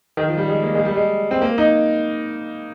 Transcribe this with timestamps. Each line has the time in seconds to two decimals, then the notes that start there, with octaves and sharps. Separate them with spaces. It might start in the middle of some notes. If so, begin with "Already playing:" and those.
0.17 D#3
0.28 F3
0.38 G3
0.49 G#3
0.63 A#3
0.75 G#3
0.85 G3
0.96 G#3
1.31 C4
1.42 A#3
1.58 D#4